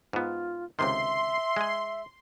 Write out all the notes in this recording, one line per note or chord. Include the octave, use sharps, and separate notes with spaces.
G#2 B3 F4
C#2 C3 D#3 E5 C6
G#3 G#4